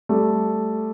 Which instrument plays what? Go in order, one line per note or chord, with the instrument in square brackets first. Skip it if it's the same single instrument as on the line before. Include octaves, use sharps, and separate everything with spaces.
[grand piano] G3 A3